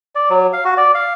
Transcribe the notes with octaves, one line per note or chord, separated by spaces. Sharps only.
D5
F#3
F5
F#4
D5
F5